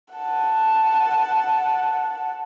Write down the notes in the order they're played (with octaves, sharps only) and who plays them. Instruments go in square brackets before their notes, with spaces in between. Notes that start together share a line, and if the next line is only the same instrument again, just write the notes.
[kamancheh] F#5 A5